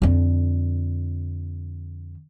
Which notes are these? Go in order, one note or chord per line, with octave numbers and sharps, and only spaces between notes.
F2 D3